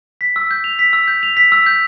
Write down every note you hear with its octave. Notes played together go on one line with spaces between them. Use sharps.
B6
E6
G6
F7
B6
E6
G6
F7
B6
E6
G6